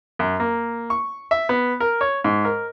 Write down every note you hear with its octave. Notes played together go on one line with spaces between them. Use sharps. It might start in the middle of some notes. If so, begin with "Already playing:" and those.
F#2
A#3
C#6
E5
B3
A#4
C#5
G#2
A#4